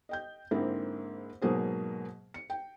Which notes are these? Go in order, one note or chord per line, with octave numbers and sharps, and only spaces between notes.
D#5 G5 G6
G#2 D3 A#3 C4 E4 G#4
G#2 B2 F#3 A#3 G#4 C5
C#7
G5